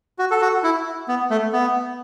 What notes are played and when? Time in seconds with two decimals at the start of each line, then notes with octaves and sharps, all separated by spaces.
0.19 F#4
0.31 A4
0.42 F#4
0.63 E4
1.08 B3
1.30 A3
1.53 B3